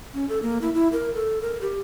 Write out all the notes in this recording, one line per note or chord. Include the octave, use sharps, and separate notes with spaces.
C#4
A4
A#3
E4
E4
A#4
A4
A#4
G4